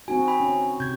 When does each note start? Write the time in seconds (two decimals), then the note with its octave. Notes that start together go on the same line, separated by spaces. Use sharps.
0.08 C4 D#4 F#4 G#5
0.28 G#5 B5
0.40 C#4
0.80 C3 G6 G#6